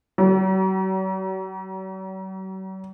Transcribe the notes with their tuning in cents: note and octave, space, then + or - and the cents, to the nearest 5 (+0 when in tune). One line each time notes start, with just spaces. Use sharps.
F#3 +45